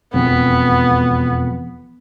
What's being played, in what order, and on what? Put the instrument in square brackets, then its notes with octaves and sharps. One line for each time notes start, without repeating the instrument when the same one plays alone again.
[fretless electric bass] E1 F2 [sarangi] B3